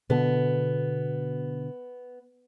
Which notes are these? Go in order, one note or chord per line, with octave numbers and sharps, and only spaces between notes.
B2 D3 B3